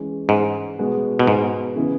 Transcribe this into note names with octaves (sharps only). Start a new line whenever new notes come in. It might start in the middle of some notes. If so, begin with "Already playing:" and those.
Already playing: E3 G#3 C#4
G#2
B2 G#3 B3 F#4
B2
G#2
C#3 E3 B3 E4